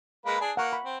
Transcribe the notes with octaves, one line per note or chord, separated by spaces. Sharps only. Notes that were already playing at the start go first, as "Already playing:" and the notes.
G#3 A#3 B4
D4 G#4
A#3 F#5 C#6
B5
C4